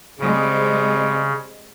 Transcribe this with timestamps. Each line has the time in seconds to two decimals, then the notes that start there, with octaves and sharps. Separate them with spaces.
0.19 C#3 G3 G#3 C4